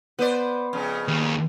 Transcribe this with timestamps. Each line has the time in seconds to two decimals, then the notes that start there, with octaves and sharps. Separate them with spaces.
0.19 B3 B4 C5 D5
0.73 F2 C#3
1.08 D#2